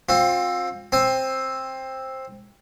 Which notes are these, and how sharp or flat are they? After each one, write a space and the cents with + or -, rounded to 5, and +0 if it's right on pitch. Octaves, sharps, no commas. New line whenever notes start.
C4 +15 F4 +35
C4 +10 G#5 +0